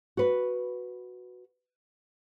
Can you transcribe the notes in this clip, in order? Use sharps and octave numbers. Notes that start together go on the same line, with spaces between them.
F#4 B4